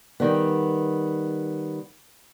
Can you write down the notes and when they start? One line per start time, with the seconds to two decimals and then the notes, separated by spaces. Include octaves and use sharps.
0.20 D#3 G3 B3